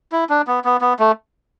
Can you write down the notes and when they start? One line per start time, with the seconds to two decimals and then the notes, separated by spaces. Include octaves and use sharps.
0.12 E4
0.29 D4
0.47 B3
0.65 B3
0.81 B3
0.99 A3